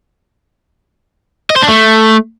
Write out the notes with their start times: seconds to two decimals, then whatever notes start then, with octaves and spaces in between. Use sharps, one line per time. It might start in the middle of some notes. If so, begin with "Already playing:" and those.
1.50 D#5
1.56 C5
1.62 D4
1.68 A3